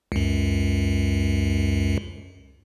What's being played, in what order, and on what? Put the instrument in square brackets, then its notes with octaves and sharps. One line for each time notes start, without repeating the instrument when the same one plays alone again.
[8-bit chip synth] C#2 F#2